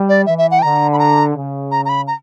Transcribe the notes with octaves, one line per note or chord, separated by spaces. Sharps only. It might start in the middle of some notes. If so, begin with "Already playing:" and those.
Already playing: G3
D5
E3 E5
E5
F#5
G5
D3 A#5
B5
A#5
C#3
A#5
A#5
B5
A#5